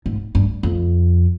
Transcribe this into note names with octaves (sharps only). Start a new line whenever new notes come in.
G#2
G2
F2